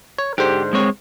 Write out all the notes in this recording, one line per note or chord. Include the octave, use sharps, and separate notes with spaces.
C#5
G#2 D3 G4 C5
G#3 C4 C#5